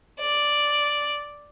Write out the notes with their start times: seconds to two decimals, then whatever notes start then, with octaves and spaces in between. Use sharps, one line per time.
0.20 D5